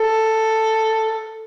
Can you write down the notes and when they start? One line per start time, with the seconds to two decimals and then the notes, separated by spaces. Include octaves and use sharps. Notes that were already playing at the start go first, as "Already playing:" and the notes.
Already playing: A4